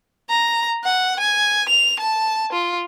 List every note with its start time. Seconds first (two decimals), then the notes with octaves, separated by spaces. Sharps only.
0.30 A#5
0.84 F#5
1.20 G#5
1.69 F7
2.00 A5
2.53 F4